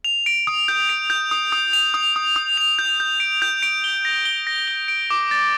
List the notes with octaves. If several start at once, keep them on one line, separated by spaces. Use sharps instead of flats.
F7
D7
D#6
G6
D7
G6
D#6
D#6
F7
D#6
D#6
D#6
F7
G6
G6
D7
G6
D7
G7
A#6
G7
A#6
G7
D7
D6
A6